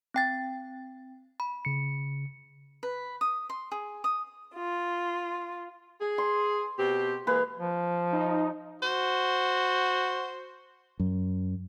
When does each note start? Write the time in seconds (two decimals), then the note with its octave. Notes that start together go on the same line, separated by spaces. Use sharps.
0.14 C4 G5 A6
1.40 B5
1.65 C#3 C#7
2.83 B4
3.21 D#6
3.49 C6
3.72 G#4
4.04 D#6
4.55 F4
6.00 G#4
6.18 C6
6.79 B2 C4 G4
7.27 E3 G#3 A#3 B4
7.59 F3
8.13 D#4
8.82 F#4 C5
11.00 F#2